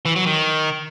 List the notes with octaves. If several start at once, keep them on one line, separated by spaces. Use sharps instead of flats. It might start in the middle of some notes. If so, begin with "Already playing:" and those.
E3
F#3
D#3